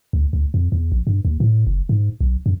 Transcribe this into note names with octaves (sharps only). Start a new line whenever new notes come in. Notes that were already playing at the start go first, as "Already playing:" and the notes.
D2
D2
F2
E2
A#1
G2
D#2
A2
F#1
G#2
B1
F#2